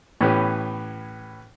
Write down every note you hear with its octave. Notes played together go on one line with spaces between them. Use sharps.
A2 E3 B3 C#4 G4